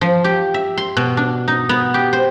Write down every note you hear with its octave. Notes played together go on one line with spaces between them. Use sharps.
F3
G4
E5
C6
B2
D4
D#4
B3
G4
C5